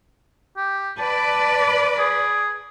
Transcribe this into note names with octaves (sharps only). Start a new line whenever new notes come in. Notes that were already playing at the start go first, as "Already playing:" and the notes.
G4
B4 D5 A5
G#4